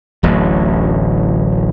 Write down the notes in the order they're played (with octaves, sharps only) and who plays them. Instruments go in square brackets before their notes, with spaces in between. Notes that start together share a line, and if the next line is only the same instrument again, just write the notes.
[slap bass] D1 A1 D2 F#3